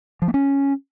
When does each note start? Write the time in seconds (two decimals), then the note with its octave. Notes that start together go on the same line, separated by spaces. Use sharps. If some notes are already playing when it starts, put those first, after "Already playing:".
0.22 F3
0.28 A#3
0.34 C#4